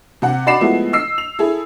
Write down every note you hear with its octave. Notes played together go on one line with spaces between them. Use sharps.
C3 F#5
D#4 F#4 D5 B5 C7 E7
F3 G#3 A3 B3 E4 F#4
D#5 E6 C7
F7
E4 G#4 A4